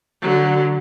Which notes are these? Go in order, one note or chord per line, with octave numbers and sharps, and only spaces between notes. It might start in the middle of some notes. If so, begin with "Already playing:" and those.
D3 F#3